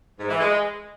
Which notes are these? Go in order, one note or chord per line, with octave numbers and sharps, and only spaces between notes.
G#2
E3
G#3